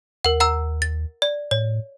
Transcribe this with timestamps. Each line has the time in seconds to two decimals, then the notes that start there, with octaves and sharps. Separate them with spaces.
0.25 D#2 A#4 F#5
0.40 F#5 A#5 E6
0.82 A6
1.22 D5
1.51 A2 C#5